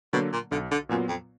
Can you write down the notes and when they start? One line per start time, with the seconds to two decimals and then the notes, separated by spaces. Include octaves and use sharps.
0.13 B2 D3 F#3 A#3
0.33 A#2
0.51 B1 D3
0.71 D3
0.89 F#2 A#2 F#3 B3 F4
1.09 F2